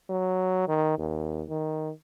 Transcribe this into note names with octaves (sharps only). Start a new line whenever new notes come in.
F#3
D#3
D#2
D#3